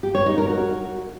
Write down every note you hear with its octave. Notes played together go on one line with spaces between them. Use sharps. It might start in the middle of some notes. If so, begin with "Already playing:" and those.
G4
C#5
D#4
A#4
F#4